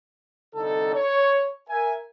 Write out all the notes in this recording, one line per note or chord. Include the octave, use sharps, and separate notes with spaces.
C2 D3 D#4 A4
C#5
A#4 E5 G#5